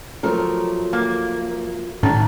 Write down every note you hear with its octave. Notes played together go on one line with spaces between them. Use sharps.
F3 F#3 A3 A#4
A#3
A2 D#3 F#3 D4